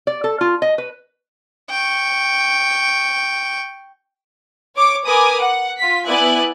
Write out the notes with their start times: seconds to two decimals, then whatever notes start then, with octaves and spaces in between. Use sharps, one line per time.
0.07 D5
0.24 A4
0.41 F4
0.62 D#5
0.78 B4
1.70 G5 C#6
4.76 C#5 D6
5.06 A#4 B4 G#5 D6 D#6
5.40 F#5
5.78 F4 B6
6.07 B3 E4 D5 G#5 F#6